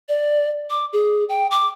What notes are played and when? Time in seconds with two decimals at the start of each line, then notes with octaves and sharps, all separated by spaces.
0.09 D5
0.70 D6
0.93 G#4
1.29 G5
1.51 D6